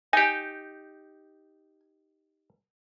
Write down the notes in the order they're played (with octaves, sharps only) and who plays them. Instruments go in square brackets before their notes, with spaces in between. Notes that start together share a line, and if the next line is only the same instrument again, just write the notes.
[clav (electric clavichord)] D#4 G4 [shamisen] G#5